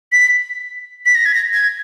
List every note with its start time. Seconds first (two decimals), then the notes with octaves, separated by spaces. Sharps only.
0.12 B6
1.06 B6
1.15 A#6
1.25 G#6
1.34 A#6
1.53 G#6